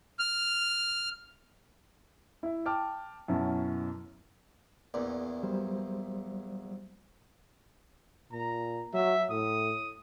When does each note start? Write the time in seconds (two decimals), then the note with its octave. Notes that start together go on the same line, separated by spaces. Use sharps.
0.19 F6
2.43 E4 E5
2.66 G5 A5 D6 F6
3.28 F#2 B2 C#4 E4 A5
4.94 A#1 E2 D5
5.43 F#3 G3 C5
8.32 A#2 A#5
8.94 F#3 E5
9.30 A2 D#6